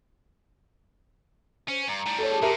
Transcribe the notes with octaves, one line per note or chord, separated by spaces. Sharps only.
C#4 C5
G2 A#5
A2 G3
A4 C#5
G4 G#4 A5
A#2 A#4 E5